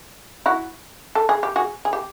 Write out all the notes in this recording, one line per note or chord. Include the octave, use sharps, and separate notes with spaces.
E4 F#4
A4
G#4
G4
F#4 G#4
G#4
G4